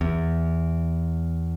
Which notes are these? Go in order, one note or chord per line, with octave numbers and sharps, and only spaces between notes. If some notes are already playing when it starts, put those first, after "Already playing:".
E2